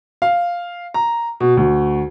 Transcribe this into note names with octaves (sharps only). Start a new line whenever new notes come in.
F5
A#5
B2
D2